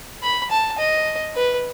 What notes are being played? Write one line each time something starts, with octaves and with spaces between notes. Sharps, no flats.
B5
A5
D#5
B4